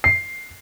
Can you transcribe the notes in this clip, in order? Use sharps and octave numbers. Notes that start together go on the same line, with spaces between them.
C7